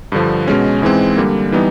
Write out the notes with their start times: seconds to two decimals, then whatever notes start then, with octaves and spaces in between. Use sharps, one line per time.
0.12 G2 D3 F3
0.48 B2 G#3 C#4
0.82 G#2 E3 G#3 C4
1.17 D3 G3 A#3
1.52 E3 G3 B3 D#4